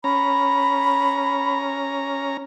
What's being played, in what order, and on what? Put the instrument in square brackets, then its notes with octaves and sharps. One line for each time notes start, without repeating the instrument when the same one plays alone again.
[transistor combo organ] C#4 A#5 [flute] B5